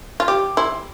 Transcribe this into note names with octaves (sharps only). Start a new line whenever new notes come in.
F4
G4 D6
E4 C6